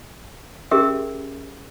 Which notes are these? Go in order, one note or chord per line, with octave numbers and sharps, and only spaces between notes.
C#4 G4 G#4 A#4 E5